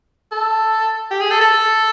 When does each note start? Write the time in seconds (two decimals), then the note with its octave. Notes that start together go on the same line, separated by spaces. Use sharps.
0.31 A4
1.11 G4
1.21 G#4
1.30 A4
1.41 A4